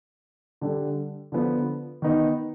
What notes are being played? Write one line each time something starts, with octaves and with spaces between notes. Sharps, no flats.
D3 G3 D4
D3 F3 B3
D#3 B3 D#4